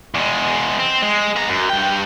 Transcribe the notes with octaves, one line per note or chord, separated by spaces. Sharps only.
E2 G#3
C4
G#3
B3 A#5
F#2
G2 G5